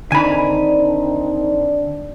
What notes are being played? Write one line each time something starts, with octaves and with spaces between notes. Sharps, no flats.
D3 D#3 C4 D4 D#4 G#5 B5